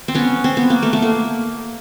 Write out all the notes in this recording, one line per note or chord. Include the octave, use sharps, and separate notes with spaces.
C4
B3 C#4
C4
B3
A#3
A3 B3
A3
A#3